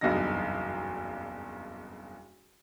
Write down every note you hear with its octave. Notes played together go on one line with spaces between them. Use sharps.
F#1 B1 E2 G2 D#4 A#6